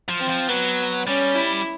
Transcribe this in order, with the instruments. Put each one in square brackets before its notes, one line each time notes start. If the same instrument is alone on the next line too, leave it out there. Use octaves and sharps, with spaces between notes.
[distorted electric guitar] F3
[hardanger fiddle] C4
[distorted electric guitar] F3
[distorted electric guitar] F#3 [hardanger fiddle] B3
[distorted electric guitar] G3 [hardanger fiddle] C#4
[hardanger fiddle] E4